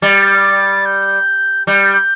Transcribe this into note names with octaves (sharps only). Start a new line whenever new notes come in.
G3 A6
G6
G3 G6